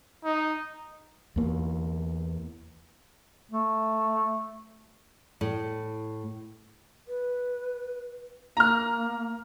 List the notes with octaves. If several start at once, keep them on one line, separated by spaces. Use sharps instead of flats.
D#4
E2 A#3
A3
A2
B4
A#3 A#5 F6